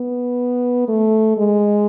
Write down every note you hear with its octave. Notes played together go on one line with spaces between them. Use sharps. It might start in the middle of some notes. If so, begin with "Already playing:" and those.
Already playing: B3
A3
G#3